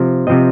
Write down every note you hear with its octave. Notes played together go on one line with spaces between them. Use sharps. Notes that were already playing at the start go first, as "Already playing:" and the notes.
Already playing: C3 F3
C3 F3 C4 D#5